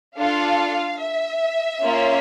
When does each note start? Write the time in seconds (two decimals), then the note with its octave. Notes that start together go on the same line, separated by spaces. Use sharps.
0.17 D4 F4 A4 F5
1.00 E5
1.81 A#3 C#4 F4